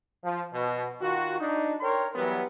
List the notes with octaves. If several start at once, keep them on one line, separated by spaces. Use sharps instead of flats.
F3
B2
D#3 F4 F#4
D4 D#4
A#4 C#5 G5 C6
E3 F#3 G3 B3